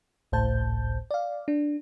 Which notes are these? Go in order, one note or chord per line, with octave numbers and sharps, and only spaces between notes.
G#1 C#2 A2 C5 A5 G6
D5 F5
D4